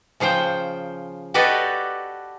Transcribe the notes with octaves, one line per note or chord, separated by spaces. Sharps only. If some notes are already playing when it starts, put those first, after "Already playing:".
C#3 F3 C5 G5
F#4 G4 A4 B4 D5 D#5